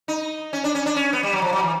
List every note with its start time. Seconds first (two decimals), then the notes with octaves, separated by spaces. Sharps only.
0.08 D#4
0.53 C#4
0.64 D4
0.75 C#4
0.86 D4
0.96 C#4
1.13 B3
1.23 G3
1.33 F#3
1.42 F3
1.53 F#3
1.63 E3